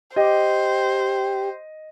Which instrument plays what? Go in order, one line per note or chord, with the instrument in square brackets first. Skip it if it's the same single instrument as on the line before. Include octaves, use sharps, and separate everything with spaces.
[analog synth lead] G4 [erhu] C5 [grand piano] D#5